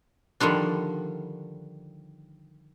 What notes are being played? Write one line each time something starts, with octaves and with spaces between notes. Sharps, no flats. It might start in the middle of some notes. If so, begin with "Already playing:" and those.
D3 D#3 F3 G3 D4